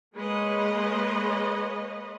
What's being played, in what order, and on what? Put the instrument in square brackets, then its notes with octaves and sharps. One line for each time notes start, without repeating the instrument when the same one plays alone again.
[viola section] G#3 A#3 B4 C#5 D#5